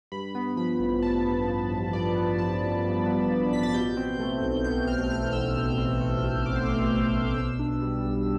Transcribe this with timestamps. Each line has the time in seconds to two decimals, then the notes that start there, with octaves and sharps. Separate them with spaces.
0.12 G2 B5
0.35 B3
0.57 F3 B5
0.80 A1
1.02 G2 A5
1.25 B3
1.48 F3
1.70 A1
1.93 G2 D5
2.15 B3
2.38 F3 A5
2.61 A1
2.84 G2
3.06 B3
3.30 F3
3.51 A1 B6
3.63 A6
3.74 B2 G6
3.97 C4
4.19 A3
4.42 B1
4.64 B2 G6
4.87 C4 F6
5.10 A3 F6
5.33 B1 E6
5.55 B2
5.78 C4
6.00 A3
6.24 B1
6.46 B2 D6
6.56 C6
6.66 C4 D6
6.91 A3
7.14 B1
7.28 D6
7.36 B2 E6
7.59 D4
7.82 G3
8.04 B1